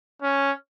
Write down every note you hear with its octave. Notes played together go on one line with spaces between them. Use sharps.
C#4